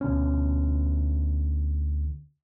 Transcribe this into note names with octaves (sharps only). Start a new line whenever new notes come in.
D2 B2 B3 C#4